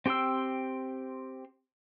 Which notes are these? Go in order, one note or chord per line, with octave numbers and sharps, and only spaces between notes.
C4 G4 G5 C6 E6